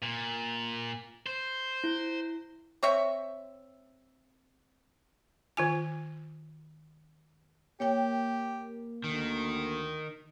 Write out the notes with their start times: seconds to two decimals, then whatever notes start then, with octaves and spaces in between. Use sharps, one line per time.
0.02 A#2
1.26 C5
1.84 E4
2.83 C4 C#5 E5
5.57 D#3 F4 G#5
7.80 A#3 G4 C#5 G5
9.04 D2 D#3